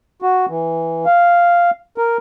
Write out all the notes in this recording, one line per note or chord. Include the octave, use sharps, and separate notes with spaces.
F#4
E3
F5
A#4